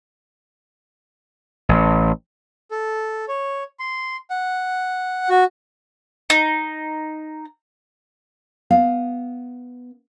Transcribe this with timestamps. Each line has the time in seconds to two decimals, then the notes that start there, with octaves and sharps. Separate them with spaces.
1.69 A1
2.71 A4
3.28 C#5
3.79 C6
4.30 F#5
5.29 F#4
6.30 D#4
8.70 B3 F5